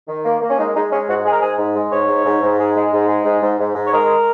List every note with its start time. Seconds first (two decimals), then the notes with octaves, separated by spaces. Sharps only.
0.08 D#3
0.24 A#3
0.41 A#3
0.49 C#4
0.58 G#3 D#4
0.75 G#3 D#4
0.92 G#3 C#4
1.09 G#2 F#4
1.25 G#3 G#4
1.32 A#4
1.41 G#2 G#4
1.58 G#2
1.75 G#3
1.91 G#2 C#5
2.08 G#2
2.26 G#2
2.43 G#2
2.58 G#3
2.76 G#3
2.93 G#2
3.08 G#3
3.25 G#2
3.42 G#2
3.60 G#2
3.75 G#2
3.87 C#5
3.92 G#3 A#4